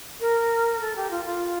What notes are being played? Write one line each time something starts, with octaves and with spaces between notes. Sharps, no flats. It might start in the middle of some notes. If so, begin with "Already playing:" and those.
A#4
A4
G4
F4
F4